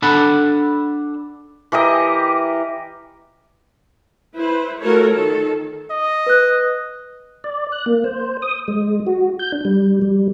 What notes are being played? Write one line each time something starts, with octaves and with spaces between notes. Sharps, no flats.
D4 A4 F#5 A5 B5
E3 G4 A#4 D#5
E4 B4 C5
A3 F4 F#4 A4 A#4 C#5
D#3 A4
D#5
B4 F#6
D5
F#6
A#3
C5
D#6
G#3
F#4
G6
D4
G3
G3